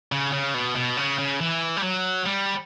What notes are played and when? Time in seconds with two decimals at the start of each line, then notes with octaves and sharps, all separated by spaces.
0.12 C#3
0.33 C#3
0.54 B2
0.76 B2
0.97 C#3
1.19 C#3
1.40 E3
1.77 G3
1.83 F#3
2.26 G3